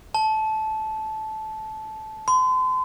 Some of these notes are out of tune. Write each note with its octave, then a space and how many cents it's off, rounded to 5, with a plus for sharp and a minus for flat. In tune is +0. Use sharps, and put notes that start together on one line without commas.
A5 -15
C6 -40